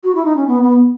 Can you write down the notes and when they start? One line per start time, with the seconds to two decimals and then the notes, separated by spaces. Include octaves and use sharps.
0.03 F#4
0.14 E4
0.24 D#4
0.36 C#4
0.47 B3
0.62 B3